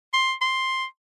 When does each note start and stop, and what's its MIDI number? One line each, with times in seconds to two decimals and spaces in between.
0.13 0.34 84
0.41 0.85 84